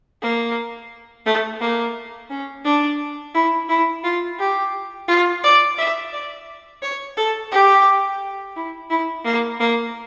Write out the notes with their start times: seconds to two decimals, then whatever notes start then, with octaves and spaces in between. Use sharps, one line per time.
0.22 A#3
1.26 A3
1.61 A#3
2.31 C#4
2.65 D4
3.35 E4
3.69 E4
4.04 F4
4.39 G4
5.08 F4
5.44 D5
5.78 E5
6.12 D5
6.83 C#5
7.17 A4
7.52 G4
8.56 E4
8.90 E4
9.25 A#3
9.60 A#3